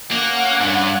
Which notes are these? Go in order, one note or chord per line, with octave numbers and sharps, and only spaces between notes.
A#3 C#4 F#5
G2